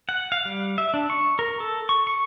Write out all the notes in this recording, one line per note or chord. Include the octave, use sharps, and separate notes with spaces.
F#5
F5
G3
E5
D4
C#6
A#4
A4
C#6
C#6